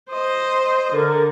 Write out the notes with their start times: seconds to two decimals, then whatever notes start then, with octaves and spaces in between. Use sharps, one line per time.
0.10 C5 D#5
0.93 D3 A#4